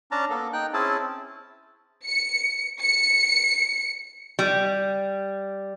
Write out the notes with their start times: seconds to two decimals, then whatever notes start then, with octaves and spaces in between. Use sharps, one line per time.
0.11 C#4 D4 A5 A#5
0.30 A#3 B3 A4
0.53 D#4 G5 F#6
0.73 C4 C#4 E4 G#4 A5
2.04 C#7
2.81 C#7
4.39 G3